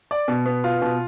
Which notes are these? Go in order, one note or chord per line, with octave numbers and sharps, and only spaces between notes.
D5
B2
B3
F4
B2